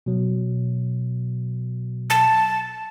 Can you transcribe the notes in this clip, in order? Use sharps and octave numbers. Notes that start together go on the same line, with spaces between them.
B2 F#3
A5